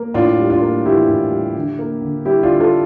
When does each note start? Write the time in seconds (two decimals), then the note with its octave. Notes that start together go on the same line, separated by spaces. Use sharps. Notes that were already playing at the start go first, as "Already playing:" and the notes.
Already playing: A#3
0.14 A2 D4 F4
0.38 G3
0.50 D4 F4
0.61 A#3
0.85 E3 E4 G4
1.09 A2
1.31 G3
1.55 D3
1.79 A#3
2.02 D3
2.25 G3 E4 G4
2.43 D4 F4
2.49 D3
2.60 F4 A4